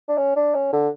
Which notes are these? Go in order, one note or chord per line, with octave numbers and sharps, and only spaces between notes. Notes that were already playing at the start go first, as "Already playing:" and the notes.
D4
C#4
D4
C#4
D3